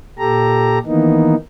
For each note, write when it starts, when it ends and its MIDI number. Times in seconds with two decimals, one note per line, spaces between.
0.19 0.79 46
0.19 0.79 67
0.19 0.79 69
0.19 0.79 82
0.86 1.35 51
0.86 1.35 52
0.86 1.35 58
0.86 1.35 59
0.86 1.35 63